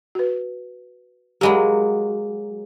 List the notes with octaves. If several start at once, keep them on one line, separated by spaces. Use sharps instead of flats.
F#4 B4
F#3 G#3 A#3 G4 B5